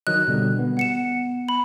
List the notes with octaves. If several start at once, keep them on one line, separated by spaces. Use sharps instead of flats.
D#3 F#3 D#5 F#6
B2 D3 G3
B3
F#5 C#7 E7
B5